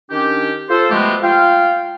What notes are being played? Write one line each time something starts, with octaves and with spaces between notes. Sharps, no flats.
D#3 C#4 D4 G4
F4 A4 C5
F3 G#3 A3 B3 F#4 G4
F4 F5 G5